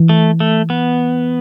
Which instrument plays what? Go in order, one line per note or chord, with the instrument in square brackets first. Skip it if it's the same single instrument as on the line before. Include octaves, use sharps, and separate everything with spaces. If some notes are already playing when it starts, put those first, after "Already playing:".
Already playing: [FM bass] E3
[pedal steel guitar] A3
A3
B3